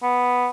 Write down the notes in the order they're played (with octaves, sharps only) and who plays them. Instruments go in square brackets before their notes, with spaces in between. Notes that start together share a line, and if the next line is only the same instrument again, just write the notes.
[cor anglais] B3